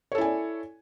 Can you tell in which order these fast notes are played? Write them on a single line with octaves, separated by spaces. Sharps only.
C#5 A4 E4 G#5 D5